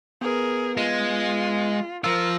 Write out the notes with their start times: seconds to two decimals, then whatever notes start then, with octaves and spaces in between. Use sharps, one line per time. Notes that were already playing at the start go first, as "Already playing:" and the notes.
0.21 B3 G#4 A#4 B4
0.77 G#3 F4
2.04 F3 F4 A#4 E6 A#6